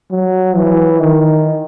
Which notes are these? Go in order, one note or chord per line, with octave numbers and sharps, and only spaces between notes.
F#3
E3
D#3